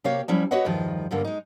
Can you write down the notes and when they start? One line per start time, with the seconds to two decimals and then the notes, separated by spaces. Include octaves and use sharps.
0.04 C3 A#3 G4 C#5 F5
0.28 F3 G3 C#4 E4
0.51 F#4 G4 B4 C#5 D#5 F#5
0.65 E2 G2 D#3 F3
1.11 D2 G2 D3 A#3
1.25 G#3 D#4